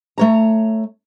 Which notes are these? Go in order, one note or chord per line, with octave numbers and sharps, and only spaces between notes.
A3 C#5 A#5